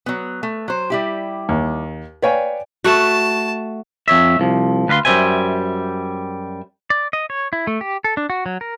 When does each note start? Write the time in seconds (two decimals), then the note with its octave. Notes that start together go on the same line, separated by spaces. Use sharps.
0.06 F#3 B3
0.43 A3
0.68 F#3 C5
0.90 G3 E4 G4
1.49 D#2
2.22 B4 C#5 D5 F5 G5 G#5
2.84 A3 F#4 A5
4.08 F2 C#5 E5
4.40 C2 F3
4.88 D2 B4 F5 B5 C6
5.05 F#2 G3 C5 E5 G#5
6.90 D5
7.13 D#5
7.30 C#5
7.53 E4
7.67 A3
7.81 G4
8.04 A4
8.17 D4
8.30 F#4
8.46 F#3
8.61 A#4